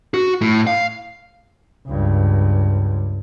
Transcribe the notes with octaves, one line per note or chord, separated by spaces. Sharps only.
F#4
A2
F5
C#2 G2